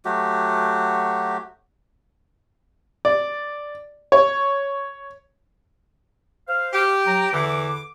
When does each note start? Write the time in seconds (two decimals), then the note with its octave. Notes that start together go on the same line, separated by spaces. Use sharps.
0.05 F#3 A3 F#4 G4
3.05 D5
4.12 C#5
6.48 C5 F5
6.73 G4
7.06 F#3 A#5
7.33 E2 D3 E3 D6